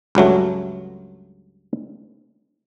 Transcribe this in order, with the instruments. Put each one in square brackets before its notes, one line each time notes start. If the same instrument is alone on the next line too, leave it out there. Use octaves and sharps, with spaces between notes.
[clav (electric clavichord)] C#2 G2 F#3 A3